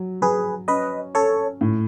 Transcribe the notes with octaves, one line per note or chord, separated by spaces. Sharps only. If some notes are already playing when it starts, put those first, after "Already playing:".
Already playing: F#3
F#3 G#4 B4
C#4 B4 D#5
C#4 A4 C#5
A2